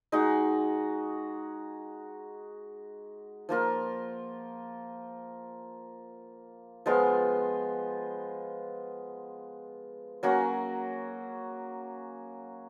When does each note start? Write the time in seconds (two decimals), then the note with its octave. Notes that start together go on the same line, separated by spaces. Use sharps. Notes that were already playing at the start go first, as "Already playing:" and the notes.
0.12 G#3 D#4 F#4
3.49 F3 A#3 F4 A#4
6.86 F3 G#3 B3 F4
10.23 F#3 A#3 C#4 F#4